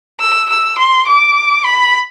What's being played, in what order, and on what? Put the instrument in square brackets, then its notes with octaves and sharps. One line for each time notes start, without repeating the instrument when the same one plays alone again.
[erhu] E6
E6
C6
D6
B5